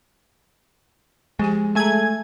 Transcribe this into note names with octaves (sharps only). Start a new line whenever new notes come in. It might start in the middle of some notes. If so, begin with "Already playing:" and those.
F3 G#3 G4 G#5
A3 G#4 G#5 A#5 G#6